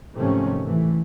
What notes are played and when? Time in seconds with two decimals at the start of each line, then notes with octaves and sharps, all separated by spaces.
0.18 G#2 C3 D#3 F3 A3 C#4
0.64 A2 E3 A3